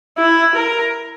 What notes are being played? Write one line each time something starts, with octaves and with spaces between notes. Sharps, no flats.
E4
A#4